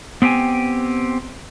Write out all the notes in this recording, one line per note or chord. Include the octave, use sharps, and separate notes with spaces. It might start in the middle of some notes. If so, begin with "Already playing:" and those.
B3 C4 G4 G5 G#5